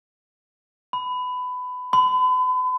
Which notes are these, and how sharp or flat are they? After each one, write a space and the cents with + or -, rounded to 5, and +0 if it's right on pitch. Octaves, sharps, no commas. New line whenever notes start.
B5 +20
B5 +40